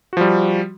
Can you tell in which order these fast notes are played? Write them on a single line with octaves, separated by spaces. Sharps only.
F#4 F3 G3